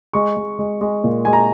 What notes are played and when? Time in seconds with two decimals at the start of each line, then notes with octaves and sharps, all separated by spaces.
0.13 G#3 C#6
0.37 G#3
0.59 G#3
0.81 G#3
1.04 A#2
1.25 G#3 G#5
1.33 A#5